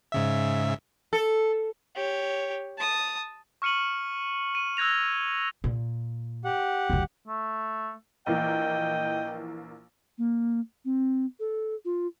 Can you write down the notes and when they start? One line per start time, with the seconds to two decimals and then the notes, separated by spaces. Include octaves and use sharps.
0.12 G#2 C#3 E5
1.13 A4
1.96 G4 C#5
2.78 A5 D#6
3.62 C#6 F6 C#7 D#7 F#7
4.55 D#7
4.77 E6 F#6 G#6 A#6 F7
5.64 A#2
6.45 G4 F#5
6.90 F#1 D2
7.28 A3
8.27 A#1 E3 A#3 D#5 G5
10.18 A#3
10.85 C4
11.40 A4
11.85 F4